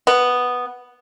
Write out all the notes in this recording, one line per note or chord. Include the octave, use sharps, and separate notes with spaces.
B3